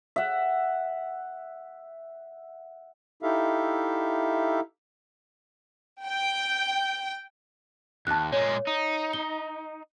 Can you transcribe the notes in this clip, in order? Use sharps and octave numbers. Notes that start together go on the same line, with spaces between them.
E5 F#5
D#4 E4 G4 A4 E5 F5
G5
D#2 A5 F#6
A#2 G#3 C#5
D#4
G7